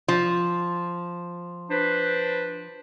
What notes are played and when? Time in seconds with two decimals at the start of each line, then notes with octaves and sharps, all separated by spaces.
0.08 F3
1.70 D4 B4 C5